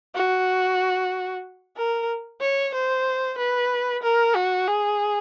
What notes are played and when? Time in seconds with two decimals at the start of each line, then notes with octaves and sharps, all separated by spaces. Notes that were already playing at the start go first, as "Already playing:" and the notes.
0.15 F#4
1.77 A#4
2.41 C#5
2.74 C5
3.38 B4
4.03 A#4
4.35 F#4
4.68 G#4